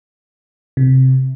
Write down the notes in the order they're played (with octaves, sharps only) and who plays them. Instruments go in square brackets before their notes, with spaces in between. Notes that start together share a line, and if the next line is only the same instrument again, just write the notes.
[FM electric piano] C3